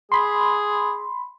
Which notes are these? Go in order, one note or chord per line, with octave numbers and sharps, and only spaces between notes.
G#4 B5 C6